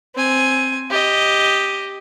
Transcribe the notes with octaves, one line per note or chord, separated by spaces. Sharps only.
C4 G#5
G4 D#5